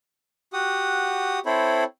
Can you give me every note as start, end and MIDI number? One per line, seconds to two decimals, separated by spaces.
0.53 1.39 66
0.53 1.39 67
0.53 1.39 78
0.53 1.39 87
1.46 1.84 60
1.46 1.84 64
1.46 1.84 69
1.46 1.84 72
1.46 1.84 73
1.46 1.84 83